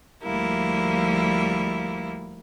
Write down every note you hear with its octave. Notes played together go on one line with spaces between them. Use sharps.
D2 F3 G3 A#3 E4